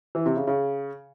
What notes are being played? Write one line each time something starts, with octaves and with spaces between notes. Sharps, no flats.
E3
C3
C#3
C#3